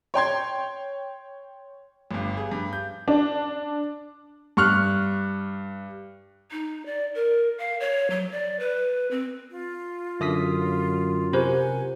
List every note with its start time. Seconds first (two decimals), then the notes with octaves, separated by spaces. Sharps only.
0.14 C#5 G5 C6 G#6
2.11 G1 G2
2.37 G#4
2.52 G2
2.73 G6
3.08 D4
4.57 G2 C#6 F6 F#6
6.52 D#4
6.86 D5
7.15 A#4
7.59 F5
7.80 C#5
8.11 F#3
8.32 D5
8.60 B4
9.11 C4
9.53 F4
10.21 F#2 D3 E5 D#6 B6
11.33 C3 F4 G4 A#4 C5 F#5 G#5 G6